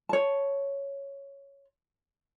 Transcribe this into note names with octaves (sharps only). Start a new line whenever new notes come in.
C#5 A5